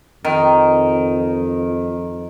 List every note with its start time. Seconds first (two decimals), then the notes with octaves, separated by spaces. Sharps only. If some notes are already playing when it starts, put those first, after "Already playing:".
0.24 F2 D#3